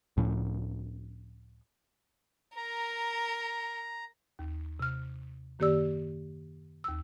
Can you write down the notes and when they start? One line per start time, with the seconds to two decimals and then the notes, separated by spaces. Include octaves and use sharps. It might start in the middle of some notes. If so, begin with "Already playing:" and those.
0.17 C#2 A2 F3 C#4
2.57 A#4 A#5
4.39 D#2
4.80 C3 F6
5.59 F#2 D#3 A#3 G4 D5 E6
6.84 D#2 E6